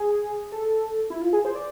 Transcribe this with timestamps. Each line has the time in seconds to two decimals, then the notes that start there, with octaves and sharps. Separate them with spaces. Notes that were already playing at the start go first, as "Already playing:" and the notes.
Already playing: G#4
0.52 A4
1.10 E4
1.21 F4
1.33 G#4
1.45 C5
1.55 D5